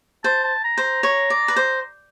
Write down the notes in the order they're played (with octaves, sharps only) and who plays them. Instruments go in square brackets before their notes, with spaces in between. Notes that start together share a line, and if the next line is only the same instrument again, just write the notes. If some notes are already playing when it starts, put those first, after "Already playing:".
[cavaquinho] C5 [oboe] A5
[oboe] A5
A#5
[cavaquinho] C5
[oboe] A#5
[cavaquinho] C#5
D5
B4
C5